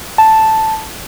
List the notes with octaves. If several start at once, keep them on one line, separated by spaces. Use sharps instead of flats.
A5